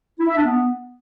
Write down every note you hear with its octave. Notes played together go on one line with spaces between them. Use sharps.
E4
E5
D4
B3